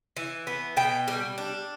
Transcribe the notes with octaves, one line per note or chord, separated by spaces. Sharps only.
E3
B3
B2 G5
G3
D4